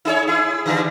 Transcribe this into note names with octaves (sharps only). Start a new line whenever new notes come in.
D#4 G#4 C#5
E4 G#4
D3 E3 G3